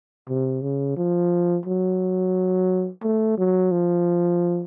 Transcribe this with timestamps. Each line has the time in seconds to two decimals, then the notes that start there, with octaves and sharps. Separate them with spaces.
0.29 C3
0.62 C#3
0.97 F3
1.66 F#3
3.03 A3
3.38 F#3
3.72 F3